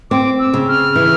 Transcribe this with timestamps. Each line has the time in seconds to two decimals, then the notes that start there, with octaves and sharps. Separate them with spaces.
0.11 C4 D6
0.39 E6
0.54 C#3
0.68 F6
0.95 E3